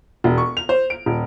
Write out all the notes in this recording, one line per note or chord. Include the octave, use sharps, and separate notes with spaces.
E1
C#6
F7
C5
D7
D#1